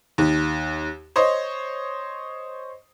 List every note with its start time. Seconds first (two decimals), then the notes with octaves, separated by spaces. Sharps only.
0.18 D#2
1.16 C5 C#5 D#5